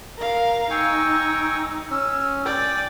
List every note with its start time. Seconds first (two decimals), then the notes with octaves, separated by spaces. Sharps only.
0.18 A#4 F5
0.70 D#4 G5 G#5 C#6 E6
1.90 C#4 E6
2.45 D5 G5 G#5